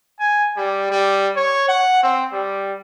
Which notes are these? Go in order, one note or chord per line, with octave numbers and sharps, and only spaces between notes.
G#5
G3
G3
C#5
F#5
C4
G3